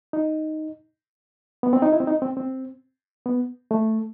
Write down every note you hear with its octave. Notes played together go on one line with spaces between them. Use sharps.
D#4
B3
C4
D#4
E4
C4
D#4
C4
C4
B3
A3